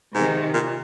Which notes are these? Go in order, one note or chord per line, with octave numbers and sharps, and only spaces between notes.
G#2 C3 D#3
A#2